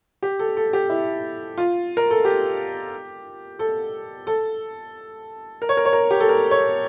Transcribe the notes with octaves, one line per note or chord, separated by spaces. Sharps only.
G4
A4
A4
G4
E4
F4
A#4
A4
G4
A4
A4
A#4
C#5
A#4
C#5
A#4
G4
A4
A#4
C#5